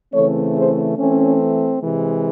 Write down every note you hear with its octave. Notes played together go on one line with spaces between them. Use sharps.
C#3 E3 A3 C4 A4 C#5
G#4 C5
E3 A3 C4 C#4
C3 E3 G#3